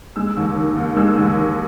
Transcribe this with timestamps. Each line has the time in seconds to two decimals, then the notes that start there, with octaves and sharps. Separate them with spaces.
0.16 G#3 E6
0.37 D#2
0.56 D#3
0.76 D#2
0.96 G#3 E6
1.18 D#2
1.38 D#3